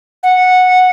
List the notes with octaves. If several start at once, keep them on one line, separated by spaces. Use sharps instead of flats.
F#5